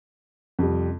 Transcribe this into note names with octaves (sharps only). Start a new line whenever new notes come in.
F2 C3 G3